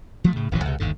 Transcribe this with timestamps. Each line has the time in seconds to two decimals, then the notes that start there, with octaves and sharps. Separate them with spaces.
0.24 F3 F#3 A3
0.36 A2 C#3
0.51 D1 A1 E3 F#3
0.65 C#2 C3
0.80 G1 D#2 G#2 D3